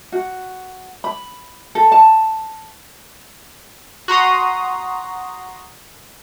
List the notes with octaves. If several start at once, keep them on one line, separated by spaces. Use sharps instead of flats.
F#4
B5
A4
A5
F#4 A#5 C6 D#6